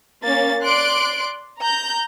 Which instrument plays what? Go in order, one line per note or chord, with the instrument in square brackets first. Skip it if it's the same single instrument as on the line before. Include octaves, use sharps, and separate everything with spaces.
[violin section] A#3 C#4 A6
D5 C6 F#6 D7
A#5 G6